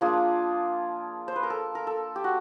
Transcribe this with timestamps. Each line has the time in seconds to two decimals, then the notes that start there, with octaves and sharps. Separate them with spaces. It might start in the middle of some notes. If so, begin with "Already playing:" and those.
0.01 F3 A#3 D4 F4 G#4
1.28 C5
1.36 B4
1.43 A#4
1.50 A4
1.75 A#4
1.87 A4
2.16 G4
2.24 F#4